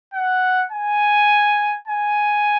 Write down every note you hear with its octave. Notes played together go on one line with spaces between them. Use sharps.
F#5
G#5
G#5